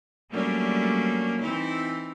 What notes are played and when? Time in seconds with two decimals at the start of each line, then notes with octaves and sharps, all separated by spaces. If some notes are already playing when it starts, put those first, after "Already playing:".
0.31 F#3 G3 A3 A#3 C#4 D4
1.42 E3 C4 D#4 E4